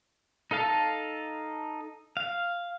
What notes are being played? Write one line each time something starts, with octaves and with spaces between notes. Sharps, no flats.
D#4 A4 F5 A5
F5